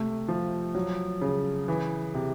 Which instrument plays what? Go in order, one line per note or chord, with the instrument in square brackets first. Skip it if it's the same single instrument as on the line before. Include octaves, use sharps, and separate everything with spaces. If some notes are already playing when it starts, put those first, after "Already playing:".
Already playing: [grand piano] C3 A3
F3
F#3
C#3
E3
C3